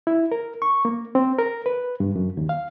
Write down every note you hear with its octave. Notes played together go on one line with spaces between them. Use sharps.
E4
A#4
C#6
A#3
C4
A#4
B4
G2
F#2
D#2
F5